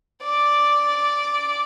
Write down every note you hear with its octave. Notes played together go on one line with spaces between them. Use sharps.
D5